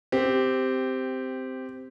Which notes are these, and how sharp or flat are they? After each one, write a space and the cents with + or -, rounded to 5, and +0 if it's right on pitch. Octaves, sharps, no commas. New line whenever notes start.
C4 -10 G4 +0